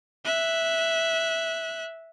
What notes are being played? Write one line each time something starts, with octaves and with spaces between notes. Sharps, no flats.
E5 F#6